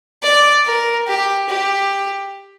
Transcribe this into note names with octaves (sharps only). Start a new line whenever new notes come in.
D5
A#4
G4
G4